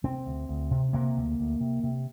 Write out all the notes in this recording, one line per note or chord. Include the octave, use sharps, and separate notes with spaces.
C3 C4
D2
D2
C3
C3 A#3
D2
D2
C3
C3